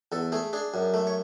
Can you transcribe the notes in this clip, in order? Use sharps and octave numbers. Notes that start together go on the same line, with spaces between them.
E2 A4
A3 G#4
D4 G#4
F#2
A3
C#5